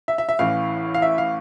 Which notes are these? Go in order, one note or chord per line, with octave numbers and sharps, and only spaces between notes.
E5
E5
E5
A1 A2 E3 F5
F5
E5
F5